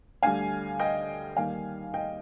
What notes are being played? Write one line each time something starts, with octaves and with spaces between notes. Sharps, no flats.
D2 D3 G3 F5 G#5
D#5 G5
D#2 D#3 G3 F5 G#5
D#5 G5